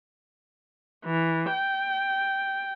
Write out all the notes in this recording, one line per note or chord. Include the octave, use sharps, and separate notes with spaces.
E3
G5